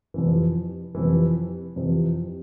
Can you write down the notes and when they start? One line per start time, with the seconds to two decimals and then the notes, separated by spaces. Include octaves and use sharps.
0.14 F2 C3 E3
0.95 F2 C3 E3
1.76 F2 C3 E3